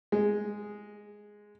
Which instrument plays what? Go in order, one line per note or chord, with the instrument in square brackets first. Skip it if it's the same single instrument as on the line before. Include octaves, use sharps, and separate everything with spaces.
[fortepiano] G#3